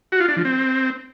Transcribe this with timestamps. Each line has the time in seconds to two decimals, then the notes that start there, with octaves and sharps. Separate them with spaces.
0.12 F#4
0.20 F4
0.28 D4
0.37 F3
0.45 C4